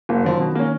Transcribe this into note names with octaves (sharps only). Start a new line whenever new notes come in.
F#1 A#3
F#2 D#3 F3
B2
A#3 C#4